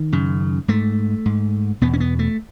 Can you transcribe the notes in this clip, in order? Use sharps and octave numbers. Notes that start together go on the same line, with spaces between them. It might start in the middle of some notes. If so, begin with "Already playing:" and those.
Already playing: D#3
F#2 C#3
G#2 A3
G#2
E2 B2 B3
C#4
B3
A3